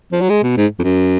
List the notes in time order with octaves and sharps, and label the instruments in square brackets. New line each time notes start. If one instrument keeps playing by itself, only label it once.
[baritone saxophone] F3
F#3
G#3
B2
G#2
F2
F#2